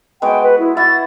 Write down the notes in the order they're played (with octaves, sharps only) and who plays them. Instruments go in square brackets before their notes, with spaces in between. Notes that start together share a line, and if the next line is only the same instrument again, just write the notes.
[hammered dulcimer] G#3 B3 F#4 [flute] G5
[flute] B4
E4
[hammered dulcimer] E4 F#4 [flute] A6